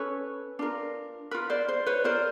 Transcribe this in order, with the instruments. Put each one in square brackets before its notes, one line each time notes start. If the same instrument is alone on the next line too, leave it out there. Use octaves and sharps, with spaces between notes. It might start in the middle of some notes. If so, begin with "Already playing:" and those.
Already playing: [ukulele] C#4 A4 B4 C#5
D4 F4 A#4
F4 A#4 B4
C5 D5
C5
B4 C#5
F4 A#4 C5 D5